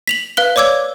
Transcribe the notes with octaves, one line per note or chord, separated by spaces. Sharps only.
B6 F7 F#7
B4 F5 F#6 G7
C#5 D5 D6 E6 G#6